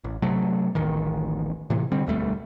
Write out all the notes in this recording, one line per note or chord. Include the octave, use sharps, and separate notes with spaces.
A1
C3 F#3 A3
D1 A1 D#3
A2 C3 E3
D3 G3 C4
E1 D2 G3 A3